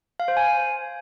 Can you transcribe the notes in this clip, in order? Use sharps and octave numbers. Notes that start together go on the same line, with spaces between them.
F5
C5
G#5